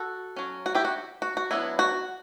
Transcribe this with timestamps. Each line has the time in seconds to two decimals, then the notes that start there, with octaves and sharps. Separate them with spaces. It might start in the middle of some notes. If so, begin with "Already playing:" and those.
Already playing: F#4 A4
0.36 F#3 C#4
0.66 F#4
0.75 E4 G4
0.85 F#4
1.22 F#4
1.37 F#4
1.51 F#3 B3 D4 E4
1.79 F#4